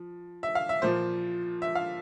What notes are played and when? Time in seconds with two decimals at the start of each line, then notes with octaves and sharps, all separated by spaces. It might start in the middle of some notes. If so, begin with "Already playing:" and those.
Already playing: F3
0.43 E5
0.55 F5
0.69 E5
0.82 A#2 F3 C5
1.62 E5
1.75 F5